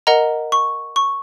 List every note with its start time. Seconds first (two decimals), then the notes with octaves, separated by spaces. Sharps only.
0.07 A#4 D#5 F#5 A#5
0.52 C#6
0.96 C#6